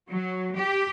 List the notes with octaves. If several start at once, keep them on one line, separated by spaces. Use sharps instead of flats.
F#3
G4